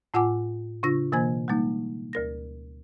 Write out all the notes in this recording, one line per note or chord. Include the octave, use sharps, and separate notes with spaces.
A2 F4 F#5 G#5 D6
C#3 D4 F4 A#6
B2 E3 A#3 C5 G#5 G#6
G3 G#3 A#3 D#4
D2 A#4 A#6